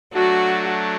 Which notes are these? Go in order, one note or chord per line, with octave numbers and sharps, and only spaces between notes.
F#3 A3 D4 F#4